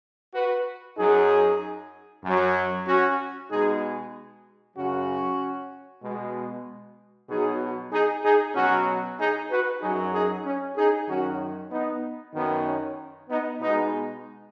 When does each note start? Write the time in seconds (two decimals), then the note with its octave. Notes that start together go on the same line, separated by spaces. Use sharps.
0.34 F#4 B4
0.97 F#2 F#3 D#4 G#4
2.24 F#2 F#3
2.87 C#4 F#4
3.50 B2 G#3 D#4 G#4
4.76 F#2 C#3 F#3 C#4 F#4
6.03 B2 G#3
7.29 B2 F#3 D#4 G#4
7.92 D#4 G#4
8.24 D#4 G#4
8.55 B2 F#3 C#4 F#4
9.19 D#4 G#4
9.50 F#4 B4
9.82 F#2 F#3 D#4 G#4
10.13 D#4 G#4
10.45 C#4
10.77 D#4 G#4
11.08 F#2 D#3 F#3 C#4 F#4
11.71 B3 D#4
12.35 F#2 D#3 F#3 B3
12.66 C#4
13.29 B3 D#4
13.61 B2 G#3 B3 D#4